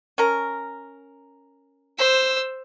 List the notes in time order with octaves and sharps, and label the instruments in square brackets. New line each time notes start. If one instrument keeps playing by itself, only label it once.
[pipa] C#4 A#4
[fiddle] C5 E6